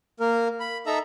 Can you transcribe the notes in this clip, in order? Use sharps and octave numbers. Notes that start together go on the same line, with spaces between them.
A#3 A#4
B5
D#4 A4 E5 A#5 E6